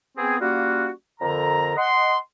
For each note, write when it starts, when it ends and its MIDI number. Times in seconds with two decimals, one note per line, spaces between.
0.18 0.36 59
0.18 0.36 60
0.18 0.36 68
0.40 0.90 55
0.40 0.90 58
0.40 0.90 61
0.40 0.90 65
0.40 0.90 66
1.21 1.75 41
1.21 1.75 50
1.21 1.75 70
1.21 1.75 82
1.77 2.16 75
1.77 2.16 78
1.77 2.16 84